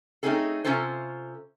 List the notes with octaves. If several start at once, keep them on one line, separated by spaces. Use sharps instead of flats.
A3 C4 C#4 D#4 G#4 A4
C3 F#3 C#4 F4 A4 C5